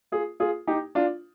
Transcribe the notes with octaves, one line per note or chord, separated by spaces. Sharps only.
F4 G#4
F4 G#4
D#4 G4
D4 F4